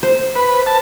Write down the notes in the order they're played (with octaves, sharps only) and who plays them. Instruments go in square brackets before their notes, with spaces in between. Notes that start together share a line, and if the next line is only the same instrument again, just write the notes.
[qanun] C5
[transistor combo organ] B4
A5